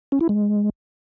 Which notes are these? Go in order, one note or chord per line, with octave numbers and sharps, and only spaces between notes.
C#4
E4
G#3